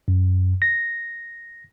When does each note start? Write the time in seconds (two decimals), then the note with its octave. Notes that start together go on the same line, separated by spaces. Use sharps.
0.08 F#2
0.62 A#6